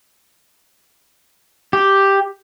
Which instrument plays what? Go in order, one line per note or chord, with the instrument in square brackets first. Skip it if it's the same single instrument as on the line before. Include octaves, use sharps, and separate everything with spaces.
[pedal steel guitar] G4